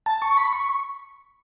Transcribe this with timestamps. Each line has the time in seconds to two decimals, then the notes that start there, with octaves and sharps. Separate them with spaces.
0.06 A5
0.22 C#6
0.37 B5
0.53 C#6